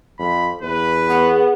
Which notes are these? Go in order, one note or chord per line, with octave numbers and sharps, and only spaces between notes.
F2 B5
E2 B4
B3 G#4 C#5